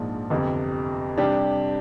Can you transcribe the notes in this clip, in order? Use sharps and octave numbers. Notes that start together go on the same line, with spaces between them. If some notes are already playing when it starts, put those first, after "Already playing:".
Already playing: A#1 G#2 F3 A#3 D4
G1 F2 C3
C3 G3 D4 G4